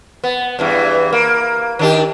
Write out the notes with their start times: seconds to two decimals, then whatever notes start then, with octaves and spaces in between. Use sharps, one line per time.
0.24 B3
0.59 E2 G2 E3
1.13 A#3
1.79 D#3 D4 G4